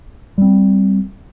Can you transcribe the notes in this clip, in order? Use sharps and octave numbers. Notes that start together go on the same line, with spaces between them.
G3 C4